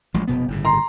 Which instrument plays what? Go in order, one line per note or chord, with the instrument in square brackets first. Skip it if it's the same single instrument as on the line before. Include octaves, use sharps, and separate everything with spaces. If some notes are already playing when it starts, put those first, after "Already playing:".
[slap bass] A1 F3 G#3
F1 B2 B3
G1 A2 C#3
[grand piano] A#5 C6